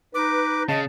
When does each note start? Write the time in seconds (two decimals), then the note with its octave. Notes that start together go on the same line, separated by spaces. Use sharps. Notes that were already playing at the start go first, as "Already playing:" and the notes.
0.14 D#4 B4 D6
0.69 C#3 D#5 A5